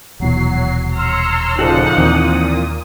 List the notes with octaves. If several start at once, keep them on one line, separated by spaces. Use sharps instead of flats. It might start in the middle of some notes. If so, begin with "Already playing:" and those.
D#1 B2 E3 F#3 C7
C#5 A#5 C6 E6 F6
A#2 C#3 F3 D#4 F#4 A4 D5 F#5
D#2 A#2 E3 C4 D#6